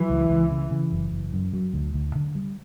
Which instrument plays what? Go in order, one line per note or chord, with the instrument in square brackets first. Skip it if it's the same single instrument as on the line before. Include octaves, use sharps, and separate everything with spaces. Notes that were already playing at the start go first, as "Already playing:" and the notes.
Already playing: [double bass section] E3 [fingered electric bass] F#3
[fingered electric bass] C#2
C#2
C#3
C#3
F#1
F#1
F#2
F#3
D2
D2
D3
G3